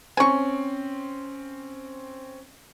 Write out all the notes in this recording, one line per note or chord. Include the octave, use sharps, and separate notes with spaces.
C4 C#4 G#5 C#6